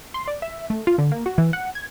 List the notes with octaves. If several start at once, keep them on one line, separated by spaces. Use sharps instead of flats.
C6
D5
E5
A3
F4
D3
A#3
F#4
E3
F#5
G#6